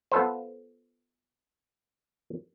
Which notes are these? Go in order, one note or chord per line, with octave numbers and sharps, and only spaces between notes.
B3 F4 A4 B4 C5